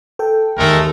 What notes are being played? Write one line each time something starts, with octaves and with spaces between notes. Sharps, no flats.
A4 G5
D#2 G#3 A3 A#4